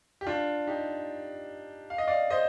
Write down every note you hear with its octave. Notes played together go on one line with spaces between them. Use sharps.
G4
D4 F4
D#4 G4
F5
D#5
D5 F5
C5 D#5